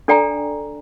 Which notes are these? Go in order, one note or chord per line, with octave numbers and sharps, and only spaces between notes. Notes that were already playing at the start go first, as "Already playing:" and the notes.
D4 A4 D5 G5 G#5 A#5